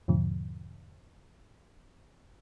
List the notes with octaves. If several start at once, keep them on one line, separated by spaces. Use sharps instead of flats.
E2 G#2 B2 D3 F3